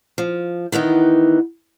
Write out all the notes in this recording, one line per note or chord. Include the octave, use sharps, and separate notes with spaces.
F3
D#3 E3 B3 D#4